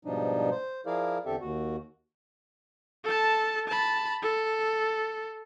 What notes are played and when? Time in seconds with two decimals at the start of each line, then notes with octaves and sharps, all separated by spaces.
0.05 G#2 B2 F3 G3 D4 D#4
0.51 C5
0.86 F3 E4 G#4 A#4 D5 F5
1.25 E2 D3 C4 G4 A4 E5
1.41 D#2 F#4
3.04 A4 A5
3.68 A5 B5
4.22 A4